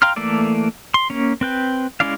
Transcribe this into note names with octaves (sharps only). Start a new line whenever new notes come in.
F5 G5 A#5 C6 F6
E3 A3 A#3 A4 D5
C6
A#3 C#4
C4 B4 G5
G#3 C#4 E4 D5 F5